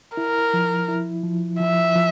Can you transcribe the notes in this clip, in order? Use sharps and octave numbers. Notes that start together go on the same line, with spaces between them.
E4 A#4
F3
E4
F3
F3 E5
F3